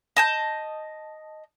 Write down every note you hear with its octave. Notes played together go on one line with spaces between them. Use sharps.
D#5 A5 G6